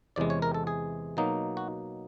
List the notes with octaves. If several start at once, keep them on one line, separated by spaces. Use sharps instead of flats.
E2 C3 E3 G#3 D5
C#5
A#4
A4
G#4
B2 F#3 A#3 D#4
F#4